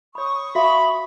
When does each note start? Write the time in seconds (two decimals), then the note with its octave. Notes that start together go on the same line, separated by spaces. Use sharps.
0.15 C#5 B5 C#6 D#6
0.55 F#4 E5 F5 B5